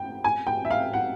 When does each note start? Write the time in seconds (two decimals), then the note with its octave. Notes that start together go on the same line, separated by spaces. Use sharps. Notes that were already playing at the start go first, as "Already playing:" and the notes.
Already playing: G5
0.24 G#5
0.47 G5
0.65 E5
0.71 F5
0.93 F#5